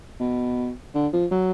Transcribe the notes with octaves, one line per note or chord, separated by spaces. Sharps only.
B2
D3
F3
F#3